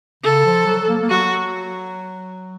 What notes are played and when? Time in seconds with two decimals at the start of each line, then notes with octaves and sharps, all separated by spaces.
0.23 C#3 A4
0.45 F3
0.66 F#3
0.89 A#3
1.02 A#3
1.10 F#3 F#4